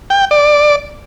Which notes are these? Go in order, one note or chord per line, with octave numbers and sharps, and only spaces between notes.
G5
D5